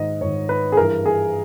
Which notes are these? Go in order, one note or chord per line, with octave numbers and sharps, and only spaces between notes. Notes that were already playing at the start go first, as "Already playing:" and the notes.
Already playing: G#2 D#3 D#5
G#2 D#3 C#5
B4
G#4
G2 E3 A#4
G#4